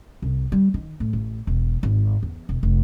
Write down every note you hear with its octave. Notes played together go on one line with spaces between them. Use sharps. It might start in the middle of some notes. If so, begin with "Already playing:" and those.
C2
G3
D#3
A2
A1
E1
G#1
E2
E1
F1